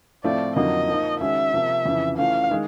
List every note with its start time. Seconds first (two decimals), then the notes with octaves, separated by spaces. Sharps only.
0.24 A2 F3 A3 C4 F4 D5
0.56 F2 D3 F#3 A#3 D#4 D#5
0.88 F3 A#3 D#4
1.21 D#3 G#3 C#4 F#4 E5
1.54 C3 F3 A#3
1.86 F2 C#3 E3
2.18 E3 A3 C#4 F4 F5
2.51 D#3 G#3